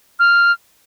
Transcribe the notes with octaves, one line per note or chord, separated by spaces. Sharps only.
F6